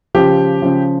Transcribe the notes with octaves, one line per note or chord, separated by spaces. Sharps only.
C#3 F3 G4
C#3 F3